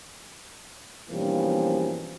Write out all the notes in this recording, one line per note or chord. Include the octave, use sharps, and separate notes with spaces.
G2 B2 E3 F3 A#3 C#4